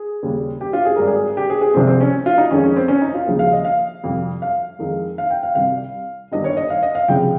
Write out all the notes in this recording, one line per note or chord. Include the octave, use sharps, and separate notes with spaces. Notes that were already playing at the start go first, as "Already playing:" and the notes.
Already playing: G#4
D#2 C#3 G3
G4
F4
G#4
G#1 G#2 G3 A#4
G#4
G4
G#4
G#4
C2 C3 F3 G#3 C4
C4
C#4
F4
D#4
F2 D#3 G#3 C#4
C#4
C4
C#4
D#4
F4
D#2 C#3 F3 G#3
F5
D#5
F5
F2 C3 G3
F5
F2 D#3 G#3
F5
G5
F5
C2 C3 G3 F5
G1 G2 D#3 G3 D#5
C#5
D#5
F5
D#5
F5
C#2 C3 F3 G#3 G5